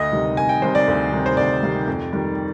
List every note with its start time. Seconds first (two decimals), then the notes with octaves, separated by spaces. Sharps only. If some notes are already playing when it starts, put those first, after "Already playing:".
Already playing: D2 D#5
0.12 C3 D#3 G3
0.37 D2 G#5
0.49 G5
0.62 C3 D#3 G3 C5
0.75 D5
0.88 D2
1.12 C3 D#3 G3
1.26 C5
1.37 D2 D5
1.63 C3 D#3 G3
1.88 F2
2.13 D#3 G3